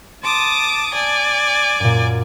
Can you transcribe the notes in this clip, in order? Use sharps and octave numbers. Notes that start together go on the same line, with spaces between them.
A5 C6 D6 D#6
D5 G#5 A5
F#2 A#2